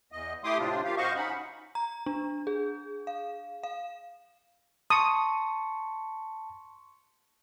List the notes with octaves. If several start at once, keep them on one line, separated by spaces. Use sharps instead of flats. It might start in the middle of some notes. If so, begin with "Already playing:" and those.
E2 D#5
A3 E4 G4 C6 D6 D#6
A2 C3 C4 D4 F4
D#3 F4 G4 F5
F#2 F#4 C5 D#5 F5 C#6
C#4 D#4 F#5 B5
A#5
D4
G#4
F5
F5
A5 C6 C#6 D#6 C#7